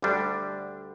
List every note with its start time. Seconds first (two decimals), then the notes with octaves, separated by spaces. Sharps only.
0.02 D2 D3 G3 D4 A4